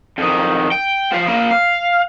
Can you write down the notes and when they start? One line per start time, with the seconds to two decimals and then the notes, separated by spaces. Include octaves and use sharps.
0.18 F2 D#3
0.72 G5
1.12 F3 C5
1.27 A#3 C5
1.51 F5